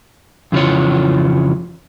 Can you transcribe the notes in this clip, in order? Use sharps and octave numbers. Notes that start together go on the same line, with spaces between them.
F2 C#3 E3 F4 C#5